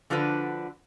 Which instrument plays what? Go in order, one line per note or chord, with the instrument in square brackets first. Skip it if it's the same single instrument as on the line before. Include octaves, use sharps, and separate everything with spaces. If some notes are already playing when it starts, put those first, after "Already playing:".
[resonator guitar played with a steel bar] D3 F3 D4 F#4 B4